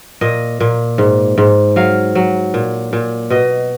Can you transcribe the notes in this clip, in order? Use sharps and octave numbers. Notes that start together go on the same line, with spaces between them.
A#2 D#5
A#2
G#2
G#2
F#3 F5
F#3
A#2
A#2
B2 D#5